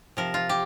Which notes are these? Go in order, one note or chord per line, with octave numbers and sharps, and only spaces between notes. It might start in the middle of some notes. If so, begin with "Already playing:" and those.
C3 F3 A#4
F4
G4